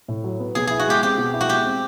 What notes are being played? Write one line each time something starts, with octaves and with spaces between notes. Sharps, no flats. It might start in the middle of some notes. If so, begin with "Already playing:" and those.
A2
F#3
B3
B2 G#4
E4 G#4
F#4
G#3 G4
C4 G4
B2
E4
F#4
G#3 G4
C4